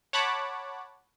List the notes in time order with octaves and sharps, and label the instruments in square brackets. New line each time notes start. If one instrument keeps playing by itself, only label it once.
[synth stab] C#5 F#5 A5 B5 D6